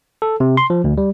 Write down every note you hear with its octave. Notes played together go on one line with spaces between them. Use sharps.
A4
C3
C6
F3
D2
G3